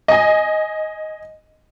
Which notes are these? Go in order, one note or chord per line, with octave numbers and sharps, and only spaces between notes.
D#5 G#5